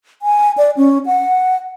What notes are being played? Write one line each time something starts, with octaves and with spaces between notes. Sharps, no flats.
G#5
D5
C#4
F#5